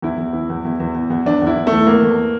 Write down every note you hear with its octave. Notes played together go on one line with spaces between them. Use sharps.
E2 E4
E2
E3
E2
E2
E2
E2
E2
E2 D4
E2 E4
E2
A3
E3
E2 A#3
E2